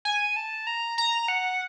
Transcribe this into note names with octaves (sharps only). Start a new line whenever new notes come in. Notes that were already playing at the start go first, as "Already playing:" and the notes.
G#5
A5
A#5
A#5
F#5